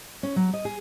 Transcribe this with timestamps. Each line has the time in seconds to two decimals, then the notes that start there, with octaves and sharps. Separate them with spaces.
0.23 C#4
0.36 F#3
0.53 D#5
0.65 G#4